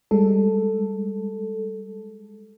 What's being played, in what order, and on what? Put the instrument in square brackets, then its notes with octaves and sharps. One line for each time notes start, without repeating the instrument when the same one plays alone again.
[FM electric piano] G3 G#3 A4